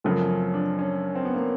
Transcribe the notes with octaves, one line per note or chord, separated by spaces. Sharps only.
F#2 C#3 F3 A3 C4
C#4
D4
C#4
C4
B3
A#3